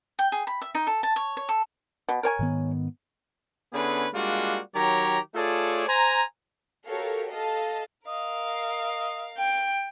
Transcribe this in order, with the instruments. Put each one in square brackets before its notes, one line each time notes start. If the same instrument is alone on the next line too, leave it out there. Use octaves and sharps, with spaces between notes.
[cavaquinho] G5
G#4
B5
E5
D#4
A4
A5
C#5
C#5
A4
[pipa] B2
A#4 C#5 G#5
[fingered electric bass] G#2 D#3 B3
[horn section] D3 B3 C#4 E4 G#4 B4
G3 G#3 A#3 D4 F4 F#4
D#3 F#3 G4 C#5 A#5
A3 F4 G#4 A4 C#5 D5
C5 G#5 A#5
[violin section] F#4 G4 A4 A#4 C#5 F5
A4 D#5 F5 A5
[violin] A#4 F5 [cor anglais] D#5
[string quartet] G5